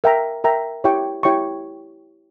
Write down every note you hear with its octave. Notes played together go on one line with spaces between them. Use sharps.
A#4 E5 G5 A#5
A#4 E5 G5 A#5
E4 G4 C#5 G5 C#6
E4 G4 C#5 G5 C#6